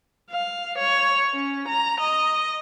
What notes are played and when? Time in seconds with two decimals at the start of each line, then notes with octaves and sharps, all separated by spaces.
0.31 F5
0.78 C#5
1.33 C#4
1.68 A#5
2.00 D#5